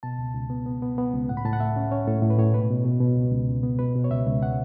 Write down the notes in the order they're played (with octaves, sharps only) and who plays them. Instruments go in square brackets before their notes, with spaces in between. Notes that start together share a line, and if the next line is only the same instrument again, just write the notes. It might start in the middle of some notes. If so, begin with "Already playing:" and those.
[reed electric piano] B2 A5
C#2
C#2
B3
B3
B3
B3
C#2
A2 F#5
B5
A2 A5
F#5
A3 E5
C#4
C#4 C#5
A2 A4
A2
B4
A2 C#5
B2 B4
B2
B2
B2
C#2
C#2
C#2
B3
B2 B4
B2
C#5
C#2 E5
C#2
F#5